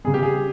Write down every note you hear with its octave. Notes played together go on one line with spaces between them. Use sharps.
C#3 G3 G#4
G4
G#4